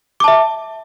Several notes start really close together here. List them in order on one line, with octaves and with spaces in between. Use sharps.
D6 A5 E5